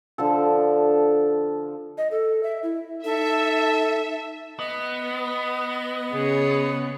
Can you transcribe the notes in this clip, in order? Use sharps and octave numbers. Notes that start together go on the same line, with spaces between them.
D3 F3 A4
D#5
A4
E5
E4
D#4 A4 E5
B3 D#5
C#3 G#4 C#5